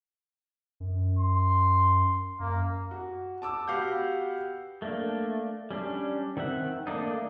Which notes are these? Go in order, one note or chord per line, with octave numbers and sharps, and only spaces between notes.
F#2
C6
F#2 A#3
F#4
A5 D6 E6
B3 F#4 G4 F5 F#5 G6
A3 A#3 D4
G3 C#4 D4
D#3 C4 E5 F#5
A3 A#3 D4 D#4